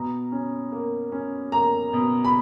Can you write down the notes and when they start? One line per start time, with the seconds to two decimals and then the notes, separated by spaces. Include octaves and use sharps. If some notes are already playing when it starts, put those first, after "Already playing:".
Already playing: B2 A#5
0.32 C#4
0.72 A#3
1.12 C#4
1.52 A#3 A#5
1.93 B2
2.25 B5